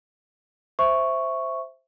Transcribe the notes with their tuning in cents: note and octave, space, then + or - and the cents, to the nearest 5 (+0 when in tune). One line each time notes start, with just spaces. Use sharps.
C5 +0 E5 +0 C#6 +0